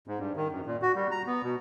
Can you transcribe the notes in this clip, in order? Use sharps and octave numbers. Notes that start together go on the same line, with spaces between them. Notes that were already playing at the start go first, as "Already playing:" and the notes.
G#2
G2
D#3
F#2
A#2
F#4
G3
A#5
B3
B2